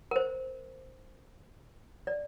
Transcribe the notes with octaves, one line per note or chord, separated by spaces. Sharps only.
A#4
C5
D5